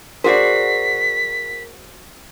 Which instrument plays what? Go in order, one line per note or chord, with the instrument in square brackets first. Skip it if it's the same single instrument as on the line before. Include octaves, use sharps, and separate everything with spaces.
[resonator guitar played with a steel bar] F#4 C5 [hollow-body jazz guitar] G#4 D5 [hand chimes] A#4 C7 [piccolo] B6